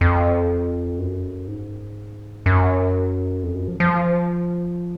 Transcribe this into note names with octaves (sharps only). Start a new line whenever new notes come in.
F2
F#2
G#2
F#2
F2
F#2
F3
F3